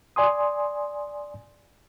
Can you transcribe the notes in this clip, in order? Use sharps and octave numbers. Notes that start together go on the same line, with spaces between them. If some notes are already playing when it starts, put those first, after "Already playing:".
D5 G#5 C6 D#6